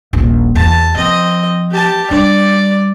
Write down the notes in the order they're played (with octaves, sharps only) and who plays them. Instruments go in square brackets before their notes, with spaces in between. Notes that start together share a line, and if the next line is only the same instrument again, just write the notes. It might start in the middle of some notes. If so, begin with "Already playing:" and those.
[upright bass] D#1 A#1
[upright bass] E2 [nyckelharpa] A5
[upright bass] F3 [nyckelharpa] C4 D#5
[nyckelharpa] G4 A5
[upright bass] G3 D4 [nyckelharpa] D5